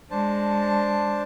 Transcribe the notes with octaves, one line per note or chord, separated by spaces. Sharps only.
G#3 D4 C5 A5